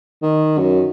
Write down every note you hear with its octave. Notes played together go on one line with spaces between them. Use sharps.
D#3
F#2